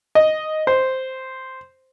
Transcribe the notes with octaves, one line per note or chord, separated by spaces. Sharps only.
D#5
C5